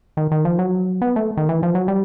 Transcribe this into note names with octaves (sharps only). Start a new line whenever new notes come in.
D#3
D#3
F3
F#3
B3
A3
D#3
E3
F3
F#3
G3